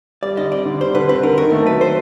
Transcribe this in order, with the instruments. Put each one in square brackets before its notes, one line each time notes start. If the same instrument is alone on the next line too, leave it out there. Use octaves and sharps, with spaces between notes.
[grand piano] G3 [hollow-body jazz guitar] D5
[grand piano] D3 [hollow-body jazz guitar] D#5
[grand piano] C4 [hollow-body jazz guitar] D5
[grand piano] D3
[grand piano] G3 [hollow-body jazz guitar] C5
[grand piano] D3 [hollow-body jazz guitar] B4
[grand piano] C4 [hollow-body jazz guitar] B4
[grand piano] D3 [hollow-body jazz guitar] A#4
[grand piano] D#3 [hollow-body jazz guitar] A#4
[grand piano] A3
[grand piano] F#3 [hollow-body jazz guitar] B4
[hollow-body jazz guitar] C5